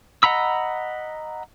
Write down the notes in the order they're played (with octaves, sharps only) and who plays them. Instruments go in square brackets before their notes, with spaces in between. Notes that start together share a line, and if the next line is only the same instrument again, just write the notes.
[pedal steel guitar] D#5 F#5 A#5 B5 E6